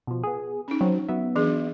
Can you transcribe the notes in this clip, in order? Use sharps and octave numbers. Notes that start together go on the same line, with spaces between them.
B2 F3
B3 G#4
C#4 D#4
F#3 C4
F#3 B3 E5
E3 D4 G#4